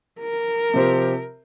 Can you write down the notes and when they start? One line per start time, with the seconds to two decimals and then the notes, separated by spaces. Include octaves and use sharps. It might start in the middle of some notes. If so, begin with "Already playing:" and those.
0.20 A#4
0.74 C3 F3 C4 G4 C5